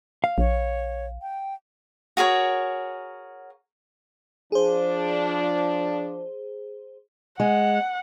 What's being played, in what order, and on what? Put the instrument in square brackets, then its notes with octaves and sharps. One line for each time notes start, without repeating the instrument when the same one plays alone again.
[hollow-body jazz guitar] F5
[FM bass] A#1 [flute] C#5
[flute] G5
[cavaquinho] F#4 G#4 A#4 C#5
[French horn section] F3 D4 [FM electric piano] G#4 C5
[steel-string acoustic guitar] G#3 [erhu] F#5